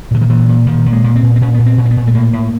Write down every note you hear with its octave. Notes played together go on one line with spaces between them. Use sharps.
A#2 D3
D#3
A#2 E3
A#2
A#2 D#3
A#2
G#3
A#2
C4
A#2
C4
A#2 C#4
A#2 B3
C4
A#2
C4
B3
A#2
A3
A2 A#3
A2